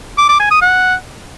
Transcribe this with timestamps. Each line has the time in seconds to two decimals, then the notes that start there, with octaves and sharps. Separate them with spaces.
0.18 D6
0.29 D6
0.40 G#5
0.51 D#6
0.62 F#5